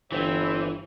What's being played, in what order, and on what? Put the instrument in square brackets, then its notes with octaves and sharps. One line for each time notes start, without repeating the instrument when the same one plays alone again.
[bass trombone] G1 [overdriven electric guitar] E3 [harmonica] C4 C#5